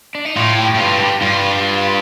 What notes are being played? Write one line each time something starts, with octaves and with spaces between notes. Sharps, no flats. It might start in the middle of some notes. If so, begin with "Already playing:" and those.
D4
D#4
A2 F4
G4
A2
G2 F4
G4
G2 F4